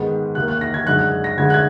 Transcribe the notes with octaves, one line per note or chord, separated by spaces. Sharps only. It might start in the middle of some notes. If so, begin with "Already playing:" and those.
Already playing: G#2 D#3 G#3 B3
D#2 D#3 A#3 F#6
F#6
A#6
G#6
F#2 D3 G#3 F#6
F#6
A#6
D2 D3 G#3 G#6
F#6
G#6